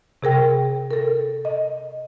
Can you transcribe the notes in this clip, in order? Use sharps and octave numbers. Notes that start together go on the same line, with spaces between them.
C3 G#4 A#4 G5
A4 A#4
D#5